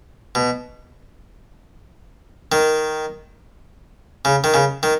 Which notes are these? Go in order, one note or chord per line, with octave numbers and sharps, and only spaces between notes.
B2
D#3
C#3
D#3
C#3
D#3